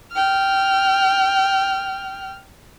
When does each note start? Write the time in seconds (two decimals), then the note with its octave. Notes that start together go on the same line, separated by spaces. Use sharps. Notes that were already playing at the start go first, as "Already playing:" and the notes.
0.13 G5 F6